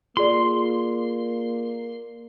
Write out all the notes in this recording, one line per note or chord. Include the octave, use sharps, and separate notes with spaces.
A#3 F4 G#4 D5 C6